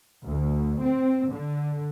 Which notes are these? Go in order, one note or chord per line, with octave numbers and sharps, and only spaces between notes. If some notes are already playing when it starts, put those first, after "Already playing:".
D2
C4
D3